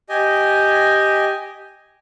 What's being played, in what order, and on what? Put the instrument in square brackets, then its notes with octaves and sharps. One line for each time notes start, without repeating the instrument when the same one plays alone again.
[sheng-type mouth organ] G4 D#5 G#5